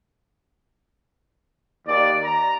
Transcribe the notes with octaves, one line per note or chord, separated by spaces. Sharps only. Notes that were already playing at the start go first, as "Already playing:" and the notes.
D#2 D5
A#5